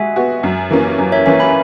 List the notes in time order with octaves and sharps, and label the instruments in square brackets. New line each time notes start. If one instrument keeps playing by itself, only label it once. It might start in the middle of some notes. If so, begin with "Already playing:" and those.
Already playing: [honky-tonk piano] G#3 F#4 [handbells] E5 G#5
[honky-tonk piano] B3 F#4
F#2
E3 A#3 C#4
F#2
[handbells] C#5 E5
[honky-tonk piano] E3 A#3 C#4 [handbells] E5 G#5
[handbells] G#5 B5